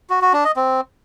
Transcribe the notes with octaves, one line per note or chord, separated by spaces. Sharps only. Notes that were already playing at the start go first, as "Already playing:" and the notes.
F#4
F#4
D4
D#5
C4